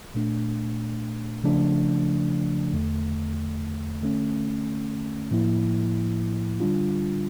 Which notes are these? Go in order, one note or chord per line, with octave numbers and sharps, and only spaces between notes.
A#2 A3 D4
C#3 F3 A3 D4
E2 D3 A3
D3 A3 C#4
A2 F3 A#3 E4
D3 G3 D4 F4